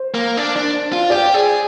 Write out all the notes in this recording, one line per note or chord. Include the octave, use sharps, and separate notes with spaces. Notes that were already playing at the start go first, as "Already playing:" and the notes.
Already playing: C5
A#3
D4
D4
F4
G4 D5
G#4